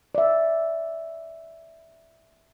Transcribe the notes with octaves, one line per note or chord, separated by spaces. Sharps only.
D5 E5